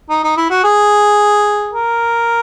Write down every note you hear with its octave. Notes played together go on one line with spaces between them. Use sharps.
D#4
D#4
E4
F#4
G#4
A#4